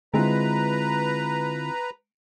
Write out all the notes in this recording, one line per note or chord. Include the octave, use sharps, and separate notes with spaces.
D3 G#3 C4 E4 F4 B4 A#5